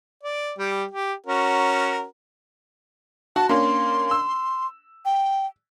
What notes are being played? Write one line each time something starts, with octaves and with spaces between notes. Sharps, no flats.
D5
G3 G4
G4
C#4 F#4 A#4
F#4 A5
A#3 C#4 D4 C6
E6
G5